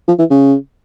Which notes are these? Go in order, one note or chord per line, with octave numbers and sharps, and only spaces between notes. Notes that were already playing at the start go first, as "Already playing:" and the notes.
F3
E3
C#3